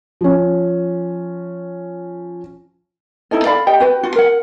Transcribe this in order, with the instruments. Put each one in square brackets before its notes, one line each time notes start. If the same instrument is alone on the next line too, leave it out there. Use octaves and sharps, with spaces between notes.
[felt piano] F3 C#4
[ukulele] D#4 E4 A4 D#5
A4 D5 F5 B5
G4 D#5 G5
F#4 B4 G5
F4 F#4
A#4 F#5